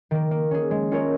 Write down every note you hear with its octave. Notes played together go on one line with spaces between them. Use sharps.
D#3 A#3
A#3
C#4 G#4
G#3
C#4 F4 A#4 C#5